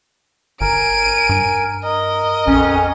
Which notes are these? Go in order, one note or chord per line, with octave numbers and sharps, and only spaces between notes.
G1 A#4 G#5 D7 D#7
G2
A#4 D#5
A#1 F2 C#4